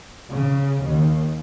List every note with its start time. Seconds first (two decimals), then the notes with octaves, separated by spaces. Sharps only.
0.31 C#3
0.84 D#2